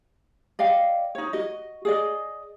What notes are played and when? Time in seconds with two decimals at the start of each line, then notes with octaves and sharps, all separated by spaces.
0.59 D5 D#5 F5 G5
1.15 D#4 C#5
1.33 F#4 D#5
1.85 G#4 D5 D#5